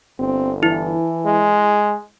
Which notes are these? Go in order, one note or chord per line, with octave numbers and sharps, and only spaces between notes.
G1 C4
E3 E4
G#3